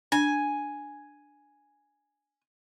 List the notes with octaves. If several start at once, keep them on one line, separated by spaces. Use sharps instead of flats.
D4 G#5